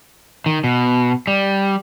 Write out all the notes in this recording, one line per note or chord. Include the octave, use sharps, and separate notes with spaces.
D#3
B2
G3